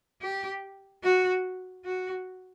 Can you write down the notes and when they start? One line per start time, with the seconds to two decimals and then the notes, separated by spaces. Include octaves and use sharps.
0.22 G4
1.03 F#4
1.85 F#4